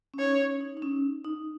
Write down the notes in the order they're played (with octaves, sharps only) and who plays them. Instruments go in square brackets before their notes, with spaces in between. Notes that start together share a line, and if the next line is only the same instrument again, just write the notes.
[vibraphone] C#4
[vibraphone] D#4 [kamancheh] C#5
[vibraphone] C#4
D#4
D#4
C#4
D#4